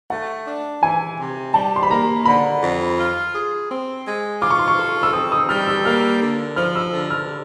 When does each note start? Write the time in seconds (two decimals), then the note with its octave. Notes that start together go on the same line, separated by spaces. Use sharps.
0.10 A3 F#5
0.47 D4
0.82 E3 G#5
1.19 C3
1.54 G3 A5
1.76 C6
1.83 B5
1.90 A#3 A#5
2.25 D3 B5
2.62 F2
2.98 F4
3.34 G#4
3.70 C4
4.06 G#3
4.41 F4 D6
4.51 C#6
4.59 C6
4.68 C#6
4.78 A4
5.03 E6
5.13 C4 D#6
5.32 D#6
5.49 G3 F6
5.67 E6
5.85 A#3 F6
6.21 D3
6.56 F3 F6
6.76 E6
6.93 D3
7.10 F6